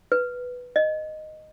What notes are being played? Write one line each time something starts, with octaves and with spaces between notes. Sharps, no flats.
B4
D#5